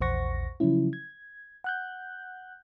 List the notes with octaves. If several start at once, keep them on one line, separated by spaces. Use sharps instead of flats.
A#1 E2 C5 F#5 C#6 A#6
C#3 F3 F#3 C#4 E4
G#6
F#5 F#6 G6